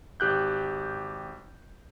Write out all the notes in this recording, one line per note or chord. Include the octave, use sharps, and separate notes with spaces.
G#1 G4 F#6 G6